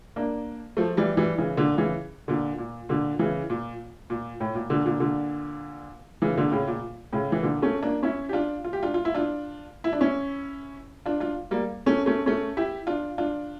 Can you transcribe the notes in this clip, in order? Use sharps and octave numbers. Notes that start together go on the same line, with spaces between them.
A#3 D4
F3 A3
E3 G3
E3 G3
C#3 E3
A#2 D3
C#3 E3
A#2 D3
A#2
A#2 D3
C#3 E3
A#2
A#2
A2
A#2
A#2 D3
A#2 D3
A#2 D3
C#3 E3
A#2 D3
A2 C#3
A#2
A2 C#3
E3
A#2 D3
A3 C#4
A#3 D4
C#4 E4
G4
D4 F4
F4
G4
D4 F4
F4
E4
D4 F4
E4
D4
C#4 E4
D4 F4
D4 F4
G3 A#3
A3 C#4
A3 C#4
A3 C#4
E4 G4
D4 F4
D4 F4